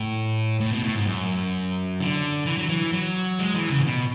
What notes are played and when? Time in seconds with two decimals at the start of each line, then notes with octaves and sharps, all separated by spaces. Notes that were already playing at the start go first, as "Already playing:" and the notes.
Already playing: A2
0.61 A2
0.72 B2
0.83 A2
0.95 G#2
1.07 F#2
2.00 D3
2.46 E3
2.58 F#3
2.69 E3
2.92 F#3
3.39 G#3
3.54 E3
3.70 C#3
3.79 A2
3.85 B2